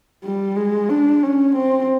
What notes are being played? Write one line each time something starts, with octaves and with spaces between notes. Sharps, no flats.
G3
G#3
D4
C#4
C4